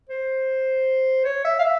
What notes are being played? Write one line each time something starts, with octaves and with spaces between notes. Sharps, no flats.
C5
C#5
E5
F5
E5